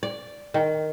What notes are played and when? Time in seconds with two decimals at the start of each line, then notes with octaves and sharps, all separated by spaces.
0.03 D5
0.54 D#3